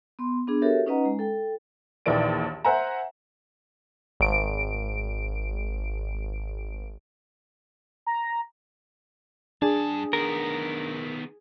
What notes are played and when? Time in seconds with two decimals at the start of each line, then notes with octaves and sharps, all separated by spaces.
0.19 B3 C6
0.48 B3 D4 G#4
0.62 F#4 G4 A4 A#4 C#5 E5
0.87 C#4 D#4 B4 D#5 F#5 A#5
1.05 G#3
1.19 A4 G5
2.06 A#1 D#2 D#3 E3 D5 D7
2.65 C5 E5 F#5 G#5 A#5
4.20 G#1 D7
8.07 A#5
9.62 G2 D4 G#4 A5
10.13 D#3 B3 A#4